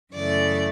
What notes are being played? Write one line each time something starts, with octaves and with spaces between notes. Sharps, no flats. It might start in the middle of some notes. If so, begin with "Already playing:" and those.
F#2 C#3 E3 A3 D5